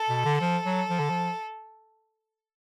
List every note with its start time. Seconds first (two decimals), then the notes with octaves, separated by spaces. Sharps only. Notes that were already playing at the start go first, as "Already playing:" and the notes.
Already playing: A4
0.09 B2
0.25 D3
0.41 F3 A4
0.66 F#3
0.90 F3
1.00 D3
1.10 F3